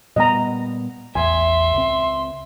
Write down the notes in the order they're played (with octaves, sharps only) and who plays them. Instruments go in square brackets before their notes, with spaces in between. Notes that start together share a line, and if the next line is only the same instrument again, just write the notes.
[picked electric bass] A#2 G3 B3 [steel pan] D#5 A#5
[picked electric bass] A1 E2 [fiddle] E5 [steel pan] G#5 [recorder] C6
[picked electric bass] C#2 C4